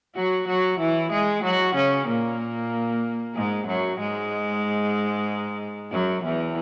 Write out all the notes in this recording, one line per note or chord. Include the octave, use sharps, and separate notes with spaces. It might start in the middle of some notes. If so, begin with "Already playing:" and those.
F#3 F#4
F#3 F#4
E3 E4
G#3 G#4
F#3 F#4
C#3 C#4
A#2 A#3
G#2 G#3
F#2 F#3
G#2 G#3
F#2 F#3
E2 E3